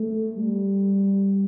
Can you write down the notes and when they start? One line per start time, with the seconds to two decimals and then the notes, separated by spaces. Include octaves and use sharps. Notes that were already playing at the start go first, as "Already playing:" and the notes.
Already playing: A3
0.36 G3